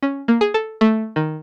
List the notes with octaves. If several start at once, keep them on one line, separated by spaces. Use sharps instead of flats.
C#4
A#3
G#4
A4
A3
D#3